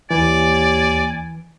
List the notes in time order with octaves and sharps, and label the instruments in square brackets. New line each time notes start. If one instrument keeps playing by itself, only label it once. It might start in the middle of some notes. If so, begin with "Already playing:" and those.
[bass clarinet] D#2 [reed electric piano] E3 [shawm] D5 [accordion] G#5